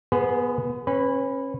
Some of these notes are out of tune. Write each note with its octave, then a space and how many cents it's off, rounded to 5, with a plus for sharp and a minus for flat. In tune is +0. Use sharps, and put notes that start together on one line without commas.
B3 -20 G#4 +0 B4 +40
C#4 -30 B4 +0